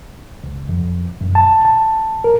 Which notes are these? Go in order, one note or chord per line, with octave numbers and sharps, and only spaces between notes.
C#2
F2
F#2
A5
A5
A#4